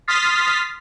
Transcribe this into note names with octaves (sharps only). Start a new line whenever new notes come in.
C6 D#6 F6 A6 B6 C7